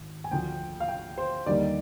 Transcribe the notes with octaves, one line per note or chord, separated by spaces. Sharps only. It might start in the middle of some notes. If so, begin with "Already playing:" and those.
Already playing: G#1
G#5
D2 D3 F3 G5
F5
G5
C5
D#2 D3 G3 A#3 D#4 D5